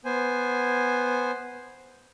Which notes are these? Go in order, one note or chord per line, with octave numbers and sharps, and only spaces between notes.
B3 C5 G#5